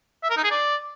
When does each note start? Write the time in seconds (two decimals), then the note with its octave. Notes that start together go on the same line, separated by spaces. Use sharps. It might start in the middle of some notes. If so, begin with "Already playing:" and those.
0.23 E5
0.30 A#4
0.37 D#4
0.44 G#4
0.51 D5